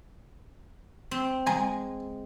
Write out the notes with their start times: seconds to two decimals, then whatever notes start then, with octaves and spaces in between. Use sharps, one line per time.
1.11 C4
1.47 G#3 G#5 A#5